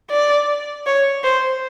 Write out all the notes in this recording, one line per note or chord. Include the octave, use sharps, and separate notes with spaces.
D5
C#5
C5